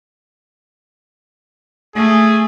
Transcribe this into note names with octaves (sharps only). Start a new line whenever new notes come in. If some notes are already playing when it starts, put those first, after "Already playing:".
A3 G#4